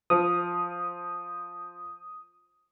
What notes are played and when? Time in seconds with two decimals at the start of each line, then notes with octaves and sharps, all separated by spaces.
0.10 F3 D#6